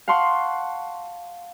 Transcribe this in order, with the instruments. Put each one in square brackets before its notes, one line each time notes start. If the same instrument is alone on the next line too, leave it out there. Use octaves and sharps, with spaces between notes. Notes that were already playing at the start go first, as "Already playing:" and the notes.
[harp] F5 F#5 A5 C6 C#6